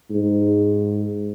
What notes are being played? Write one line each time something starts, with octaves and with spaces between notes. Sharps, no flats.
G#2